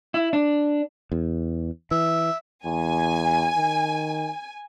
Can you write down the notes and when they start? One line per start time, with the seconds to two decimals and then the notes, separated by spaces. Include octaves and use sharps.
0.14 E4
0.33 D4
1.12 E2
1.91 E3 E5
2.65 E2 G#5
3.57 D#3